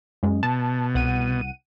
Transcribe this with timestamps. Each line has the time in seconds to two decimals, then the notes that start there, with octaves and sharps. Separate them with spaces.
0.23 F#2 G#3
0.43 B2 A5
0.95 C2 F#5 D#7